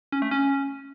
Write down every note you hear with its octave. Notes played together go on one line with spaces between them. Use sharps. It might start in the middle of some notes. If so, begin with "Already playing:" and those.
C#4
A3
C#4